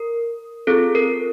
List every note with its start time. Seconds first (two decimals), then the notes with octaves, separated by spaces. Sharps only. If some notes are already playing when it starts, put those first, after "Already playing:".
Already playing: A#4
0.67 C4 F4 G#4 A4
0.95 A#4